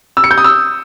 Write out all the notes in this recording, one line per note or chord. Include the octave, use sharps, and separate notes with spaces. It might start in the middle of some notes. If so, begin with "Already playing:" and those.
E6
C#7
G6
D#6
E6